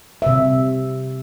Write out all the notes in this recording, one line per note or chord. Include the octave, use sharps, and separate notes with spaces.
C3 E5